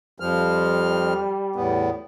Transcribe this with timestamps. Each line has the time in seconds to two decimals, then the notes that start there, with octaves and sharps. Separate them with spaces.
0.20 F2 F3 G3 F6
1.56 E2 A2 B3